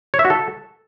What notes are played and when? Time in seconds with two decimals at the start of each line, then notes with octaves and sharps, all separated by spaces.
0.14 C#5
0.19 E5
0.25 F#4
0.30 A4